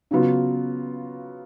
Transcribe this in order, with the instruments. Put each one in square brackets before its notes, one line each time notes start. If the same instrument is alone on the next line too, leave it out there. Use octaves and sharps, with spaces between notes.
[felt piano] C#3 F#3 B3 F4